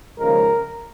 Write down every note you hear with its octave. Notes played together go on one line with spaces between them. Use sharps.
D#2 C#3 F3 G#3 A#4